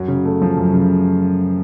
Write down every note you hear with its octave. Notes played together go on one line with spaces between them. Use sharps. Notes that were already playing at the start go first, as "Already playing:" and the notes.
Already playing: F#2 F#3
C#3
A3
F3
F#2
C#3